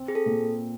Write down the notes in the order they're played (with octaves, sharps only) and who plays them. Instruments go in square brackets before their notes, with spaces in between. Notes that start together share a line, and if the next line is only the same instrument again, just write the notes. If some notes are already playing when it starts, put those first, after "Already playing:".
Already playing: [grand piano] C4
[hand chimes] G#4
A4
[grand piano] A#2